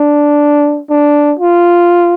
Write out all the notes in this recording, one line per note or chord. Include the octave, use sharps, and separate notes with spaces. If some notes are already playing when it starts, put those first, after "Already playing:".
Already playing: D4
D4
F4